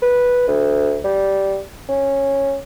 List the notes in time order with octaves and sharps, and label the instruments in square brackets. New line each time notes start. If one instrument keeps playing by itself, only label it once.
[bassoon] B4
D2
G3
C#4